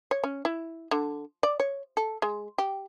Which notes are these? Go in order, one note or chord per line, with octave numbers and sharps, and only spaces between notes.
C#5
C#4
E4
D3
D5
C#5
A4
G#3
G4